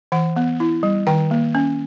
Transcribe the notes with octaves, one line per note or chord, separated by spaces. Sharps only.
E3 F#5
B3
E4
G3
D#3 G5
A#3
C#4